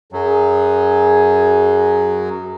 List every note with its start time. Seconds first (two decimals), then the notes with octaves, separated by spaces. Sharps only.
0.13 F#2 F#3 G#4